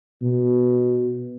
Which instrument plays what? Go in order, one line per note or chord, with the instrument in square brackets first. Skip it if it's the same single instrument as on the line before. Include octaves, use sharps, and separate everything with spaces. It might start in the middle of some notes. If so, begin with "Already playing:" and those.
[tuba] B2